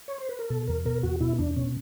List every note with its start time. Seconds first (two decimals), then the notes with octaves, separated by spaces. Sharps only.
0.08 C#5
0.18 C5
0.29 B4
0.39 A#4
0.50 B2 A4
0.67 E2 A#4
0.85 B2 A#4
1.03 E2 F#4
1.21 B2 E4
1.38 E2 D4
1.56 B2 C#4